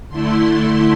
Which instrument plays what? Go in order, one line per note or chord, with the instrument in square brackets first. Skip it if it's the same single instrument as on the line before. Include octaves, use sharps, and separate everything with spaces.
[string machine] D3 A3 E4 C6